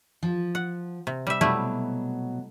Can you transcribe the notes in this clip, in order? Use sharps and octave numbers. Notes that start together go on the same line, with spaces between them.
F3
F#5
C3
G3 E5
B2 F#3 G3 A3 E4